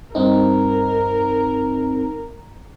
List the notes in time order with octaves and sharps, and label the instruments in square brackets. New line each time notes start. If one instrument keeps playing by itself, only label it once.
[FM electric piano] G2 C4 D#4 [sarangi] A#4